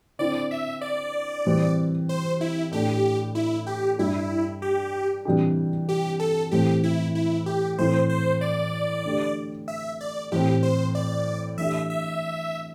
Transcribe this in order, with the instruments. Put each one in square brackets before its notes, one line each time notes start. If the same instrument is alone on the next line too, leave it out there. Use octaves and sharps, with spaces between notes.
[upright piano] D3 C4 E4 [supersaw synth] D5
[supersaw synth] E5
D5
[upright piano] C3 E3 G3 C4
[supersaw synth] C5
E4
[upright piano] A2 A3 D4 [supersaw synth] G4
[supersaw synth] E4
G4
[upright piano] G2 G3 D4 G4 [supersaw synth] E4
[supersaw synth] G4
[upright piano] C3 E3 G3 D4 G4
[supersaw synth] G4
A4
[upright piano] A2 E3 A3 C4 [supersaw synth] G4
[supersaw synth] E4
E4
G4
[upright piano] A2 E3 C4 E4 [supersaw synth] C5
[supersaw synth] C5
D5
[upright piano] D3 A3 D4 G4
[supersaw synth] E5
D5
[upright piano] A2 E3 A3 C4 [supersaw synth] G4
[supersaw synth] C5
D5
[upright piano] E3 A3 D4 G4 [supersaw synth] E5
[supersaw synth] E5